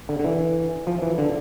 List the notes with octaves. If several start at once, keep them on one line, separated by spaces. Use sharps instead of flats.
D3
D3
E3
F3
E3
D3